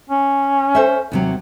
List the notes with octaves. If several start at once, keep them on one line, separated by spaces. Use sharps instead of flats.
C#4
A4 C5 E5
D#2 C3 F#3